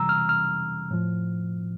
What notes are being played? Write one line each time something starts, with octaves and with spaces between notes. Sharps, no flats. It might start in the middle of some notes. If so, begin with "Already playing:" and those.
Already playing: C3 E3 G3 A#5 E6
F6
F6
A2 F3